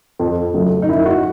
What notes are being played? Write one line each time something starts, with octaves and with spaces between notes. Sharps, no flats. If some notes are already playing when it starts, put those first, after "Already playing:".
F2
C#3 F#3 A3
D#4
F#2 E4
F#4